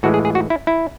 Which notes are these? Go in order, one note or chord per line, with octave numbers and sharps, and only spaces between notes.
A2 E3 G#3 F#4
G#4
G#4
F#4
E4
E4